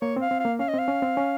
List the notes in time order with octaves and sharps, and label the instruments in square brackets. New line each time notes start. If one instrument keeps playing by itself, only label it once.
[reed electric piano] A#3 [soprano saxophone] C#5
[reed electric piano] C4
[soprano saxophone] F5
[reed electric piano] C4
[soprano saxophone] F5
[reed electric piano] A#3
[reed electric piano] C#4 [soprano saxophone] F5
[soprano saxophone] D#5
[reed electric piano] C4 [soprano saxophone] F5
[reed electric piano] C#4
C4
C#4